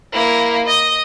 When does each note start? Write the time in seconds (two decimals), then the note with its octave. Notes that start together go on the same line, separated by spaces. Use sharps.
0.13 A#3 E4
0.66 D#5